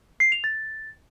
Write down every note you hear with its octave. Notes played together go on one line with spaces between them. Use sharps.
C7
F7
A6